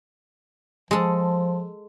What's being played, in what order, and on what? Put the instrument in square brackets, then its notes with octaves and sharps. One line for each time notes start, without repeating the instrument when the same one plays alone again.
[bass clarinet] F3 [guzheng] G#3 A4